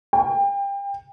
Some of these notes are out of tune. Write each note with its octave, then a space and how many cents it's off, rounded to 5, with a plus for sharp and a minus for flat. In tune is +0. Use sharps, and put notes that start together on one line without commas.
G5 +25